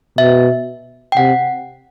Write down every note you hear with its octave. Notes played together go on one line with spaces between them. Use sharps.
B2 E5
G5
C3 F#5